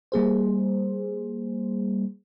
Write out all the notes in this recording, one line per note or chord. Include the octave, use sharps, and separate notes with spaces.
G3 A#3 G#4 C5